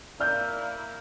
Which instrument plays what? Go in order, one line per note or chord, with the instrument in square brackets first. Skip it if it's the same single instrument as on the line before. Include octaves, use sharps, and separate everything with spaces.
[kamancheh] A#3 E4 [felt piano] D5 F6 G6